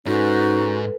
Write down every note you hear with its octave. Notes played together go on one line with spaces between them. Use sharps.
G#2 C#4 D#4 F#4 A4 B4